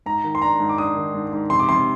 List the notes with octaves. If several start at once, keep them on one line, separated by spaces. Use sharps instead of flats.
G#2 A#5
D#3
C6
D4 A#5
G#2
D6
D4 D#6
D#3
G#2
G#2
C3 C6
D6
C3 C6